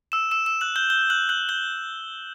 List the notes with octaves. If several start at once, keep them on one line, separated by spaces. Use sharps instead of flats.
E6 E7
E6 E7
E6 E7
F#6 F#7
G6 G7
G6 G7
F#6 F#7
F#6 F#7
G6 G7